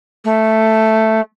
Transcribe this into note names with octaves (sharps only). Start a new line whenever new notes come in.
A3